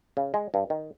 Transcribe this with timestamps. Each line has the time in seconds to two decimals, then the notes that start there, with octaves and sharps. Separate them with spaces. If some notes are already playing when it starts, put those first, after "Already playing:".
0.17 C#3
0.34 G#3
0.54 G2
0.70 D#3